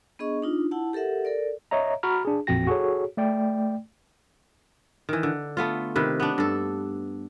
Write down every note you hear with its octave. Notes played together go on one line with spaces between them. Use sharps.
B3 D4 G#4 D#5 C#6
D4 D#4 F4
E4 F#5 A5
G4 A4 A#4 E5 F#5
A4 A#4 D5
C#5 D#5 E5 A#5
F#4 A#5 B5 C#6 F6
D4 G#4
A1 F2 A#2 F#4 G5 A#6
F#4 G#4 A4 C#5
A3 D5 G5
D#3 E3
D3
A3 B3 F4
C3 D#3 B4
B3 D4
G2 A4